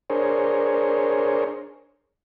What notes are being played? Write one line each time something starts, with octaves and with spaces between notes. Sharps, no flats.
D4 G#4 A#4 C5 C#5